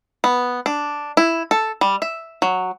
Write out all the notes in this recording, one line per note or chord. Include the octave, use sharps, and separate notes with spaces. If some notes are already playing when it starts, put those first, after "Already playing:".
B3
D4
E4
A4
G3
E5
F#3